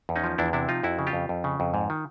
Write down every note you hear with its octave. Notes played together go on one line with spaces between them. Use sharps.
E2
C#4 D#4
F3
E2 D4 E4
C3 D4 E4
F3 D#4 F4
F2 E4 F#4
C#3
F4 G4
F2
F2
C#3
F2
G#2
D#3